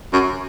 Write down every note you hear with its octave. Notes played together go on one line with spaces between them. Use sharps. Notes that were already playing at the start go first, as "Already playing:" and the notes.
F#2